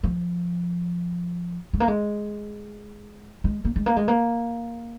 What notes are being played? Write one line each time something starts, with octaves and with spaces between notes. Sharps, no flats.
F3
G#3
A#3
G#3
G#3
A#3
G#3
A#3
G#3
A#3